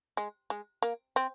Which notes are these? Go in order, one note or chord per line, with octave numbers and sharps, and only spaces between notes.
G#3
G#3
A#3
C4